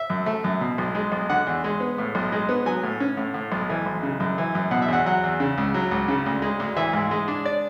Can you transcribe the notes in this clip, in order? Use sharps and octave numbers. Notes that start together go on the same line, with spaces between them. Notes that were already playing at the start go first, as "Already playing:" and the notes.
Already playing: E5
F#2
A3
F#2
B2
B1
G#3
B1
D3 F#5
E2
G#3
B3
A2
B1
G#3
B3
F#3 G#5
A2
C#4
A2
A2
B1
E3
B1
C#3
F#2
E3
F#2
B2 F#5
E5
E2 F#5
F#3 F#5
E2
C#3
C#2
F#3
C#2
C#3
D2
G#3
D2
E3 E5
G#2
G#3
D4
D5